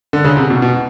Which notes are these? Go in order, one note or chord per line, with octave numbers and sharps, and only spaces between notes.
D3
C#3
C3
B2
B2